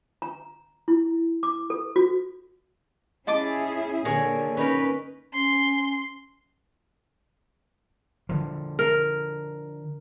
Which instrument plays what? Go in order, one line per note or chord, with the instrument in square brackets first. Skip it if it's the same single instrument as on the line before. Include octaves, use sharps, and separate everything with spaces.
[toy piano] A#5
E4
D6
A4
F#4
[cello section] C#4 E4 G#4 [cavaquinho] D#5 A5 D6
[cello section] A#2 D3 [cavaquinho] G#4 C#5 [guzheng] A#4
[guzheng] C#4 D#4 A#4 [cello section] B4
[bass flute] C#4 [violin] C6
[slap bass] D3 F3
[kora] A#4